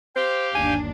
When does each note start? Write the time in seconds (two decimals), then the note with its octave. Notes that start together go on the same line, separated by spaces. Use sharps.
0.16 G4 C5 F5 G5
0.55 G1 D#2 D4 G#5